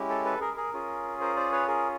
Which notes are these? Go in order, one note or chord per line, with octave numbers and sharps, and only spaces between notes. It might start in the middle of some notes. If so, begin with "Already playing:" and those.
Already playing: G#3 C#4 E4 G4
A4
A4 B4
G#4 A#4
G#4 A#4
C#4 F4 G#4
A#4 C5
C5 D5
B4 C#5
G#4 A#4